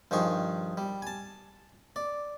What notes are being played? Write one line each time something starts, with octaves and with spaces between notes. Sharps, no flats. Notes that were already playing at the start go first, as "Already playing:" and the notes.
G2 D#3 F3 G#4 C#6
G3
G#5 A5
D5